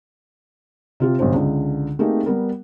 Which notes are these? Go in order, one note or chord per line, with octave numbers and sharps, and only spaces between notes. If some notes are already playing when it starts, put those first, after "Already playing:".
C3 F4 G4
B1 G2 D3 C5
C#2 D3
A3 A#3 C4 D#4 G4 G#4
G3 B3 A#4